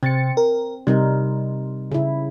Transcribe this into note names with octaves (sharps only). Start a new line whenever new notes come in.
C3 C4 A6 C#7
A#4
C3 G3 D#4 A#4
C#3 E4